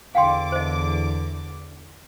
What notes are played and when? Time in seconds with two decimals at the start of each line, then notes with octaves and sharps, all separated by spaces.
0.15 E2 D3 F5 G5 C6 D6
0.52 C5 D#5